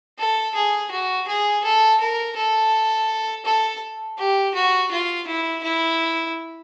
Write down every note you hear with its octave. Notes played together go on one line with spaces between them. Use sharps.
A4
G#4
F#4
G#4
A4
A#4
A4
A4
G4
F#4
F4
E4
E4